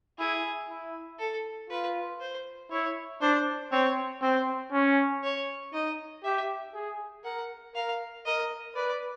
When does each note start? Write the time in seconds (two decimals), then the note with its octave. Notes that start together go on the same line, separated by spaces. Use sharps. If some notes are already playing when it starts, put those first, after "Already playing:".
0.19 E4 G#4
0.69 E4
1.19 A4
1.70 F4 B4
2.21 C5
2.71 E4 C#5
3.21 D4 C5
3.72 C4 C#5
4.22 C4 C5
4.72 C#4
5.23 C#5
5.73 D#4 D#5
6.24 G4 E5
6.74 G#4
7.25 A#4 F#5
7.75 A#4 F5
8.26 A#4 D#5
8.76 B4 D5